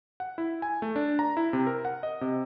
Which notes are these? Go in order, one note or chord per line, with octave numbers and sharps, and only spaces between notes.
F#5
E4
G#5
A3
D4
A#5
E4
C3
A#4
F#5
D#5
C3